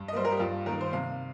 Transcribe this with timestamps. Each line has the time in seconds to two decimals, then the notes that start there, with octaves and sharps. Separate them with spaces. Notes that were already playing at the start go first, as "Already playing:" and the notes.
Already playing: G2
0.08 D#5
0.13 G3 A#3 C5
0.25 A#4
0.32 G4
0.39 G2 F4
0.66 D#3 A#3 A#4
0.81 C5
0.93 C3 F5